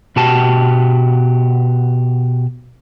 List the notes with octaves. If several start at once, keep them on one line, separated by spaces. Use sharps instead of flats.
B2 F#4 G4 A5